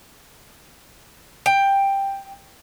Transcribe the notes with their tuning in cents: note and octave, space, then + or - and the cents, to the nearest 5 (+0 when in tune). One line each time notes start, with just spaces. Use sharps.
G5 +10